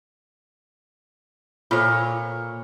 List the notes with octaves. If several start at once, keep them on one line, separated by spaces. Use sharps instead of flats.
A#2 F4 A4 C5 C#5